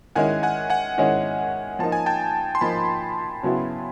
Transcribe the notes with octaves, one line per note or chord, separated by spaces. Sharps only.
D#3 G#3 C#4 E4 F#5 G#5
F#5 G#5
F#5 G#5
D#3 G#3 C#4 E4
F3 A#3 D#4 A5
G#5
G5 A5
C6
F3 A#3 D#4 A5 B5
C#3 F#3 B3 E4